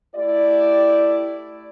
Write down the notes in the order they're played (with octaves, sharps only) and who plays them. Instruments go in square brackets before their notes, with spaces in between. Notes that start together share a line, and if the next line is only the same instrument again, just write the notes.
[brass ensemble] A3 E4 G4 D5